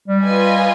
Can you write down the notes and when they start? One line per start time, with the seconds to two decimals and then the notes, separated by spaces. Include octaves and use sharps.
0.08 G3
0.24 F4 B4 D#5 G#5